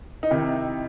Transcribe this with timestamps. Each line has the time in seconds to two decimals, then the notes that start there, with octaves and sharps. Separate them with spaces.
0.23 D#4
0.31 C3 D#3 E4